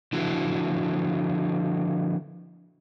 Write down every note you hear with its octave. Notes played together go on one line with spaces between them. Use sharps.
D3 F3 E4 F#4